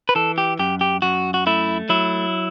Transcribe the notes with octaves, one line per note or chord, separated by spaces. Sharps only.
B4
E3 A4
G4
F#2 G4
G4
F#2 F#4
F#4
A3 E4
F#3 E4